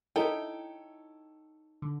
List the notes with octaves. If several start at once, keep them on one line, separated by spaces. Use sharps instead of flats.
D#4 E4 A4 C#5 G5
D3